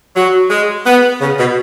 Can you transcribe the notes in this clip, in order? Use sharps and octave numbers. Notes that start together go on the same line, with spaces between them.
F#3
G#3
B3
C#3
B2